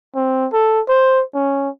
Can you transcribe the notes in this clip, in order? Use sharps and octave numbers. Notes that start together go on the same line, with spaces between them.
C4
A4
C5
C#4